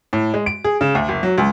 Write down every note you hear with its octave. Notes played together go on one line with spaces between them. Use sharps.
A2
G#3
D7
G#4
C#3
D2
F#1
F#3
C#2